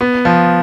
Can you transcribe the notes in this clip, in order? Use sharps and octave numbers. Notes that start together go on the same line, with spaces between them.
B3
F3